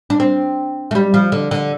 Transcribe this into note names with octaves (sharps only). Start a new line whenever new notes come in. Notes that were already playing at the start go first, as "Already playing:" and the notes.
D4
C4
A3
G3
F3
D3
D3